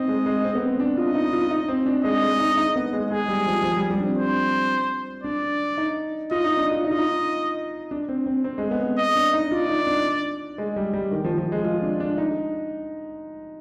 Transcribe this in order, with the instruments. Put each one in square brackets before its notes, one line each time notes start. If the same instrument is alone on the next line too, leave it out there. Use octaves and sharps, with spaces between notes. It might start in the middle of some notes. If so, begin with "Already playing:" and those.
Already playing: [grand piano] C4 D#4 [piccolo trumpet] D#5
[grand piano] G#3
G#3
C4
B3
C4
D4
[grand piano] F4 [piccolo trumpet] D#5
[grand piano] D#4
F4
D#4
C4
D4
[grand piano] G#3 [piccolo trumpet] D#5
[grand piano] G#3
D#4
D#4
B3
G#3
[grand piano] G#3 [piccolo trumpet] G#4
[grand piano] G3
F3
F3
G3
G3
D4
C4
[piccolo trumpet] C5
[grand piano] D4 [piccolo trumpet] D5
[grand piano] D#4
[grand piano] F4 [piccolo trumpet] D#5
[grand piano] D#4
D4
F4
[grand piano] D#4 [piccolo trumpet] D#5
[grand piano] F4
D#4
D4
C4
C4
C4
G#3
B3
[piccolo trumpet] D#5
[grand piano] D4
D#4
[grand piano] F4 [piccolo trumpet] D5
[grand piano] D#4
D4
G#3
G3
G3
D#3
F3
F3
G#3
F4
D4
D4
D#4